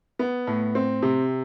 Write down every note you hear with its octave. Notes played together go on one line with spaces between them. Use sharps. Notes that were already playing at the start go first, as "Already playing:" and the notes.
B3
A2
C4
C3